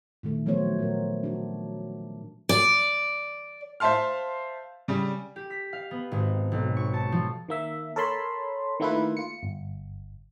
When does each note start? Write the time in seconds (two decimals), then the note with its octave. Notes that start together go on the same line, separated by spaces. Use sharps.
0.23 A#2 D#3 A3
0.46 F3 F#3 A3 B3 C5 C#5
0.79 A#2 A#4
1.23 D4 F#4
2.49 D5
3.80 C5 E5 F5 A5 C6 F6
4.88 C#3 G3
5.36 G4
5.50 B6
5.73 F5
5.91 B3
6.12 G#1
6.52 B1
6.77 C#6
6.94 A5
7.12 F3
7.48 D#3 A#3 E5
7.96 A4 A#4 C#5 A5 B5 C6
8.80 D#3 A3 A#3 E4 F4 B4
9.17 F4 C#7
9.43 G1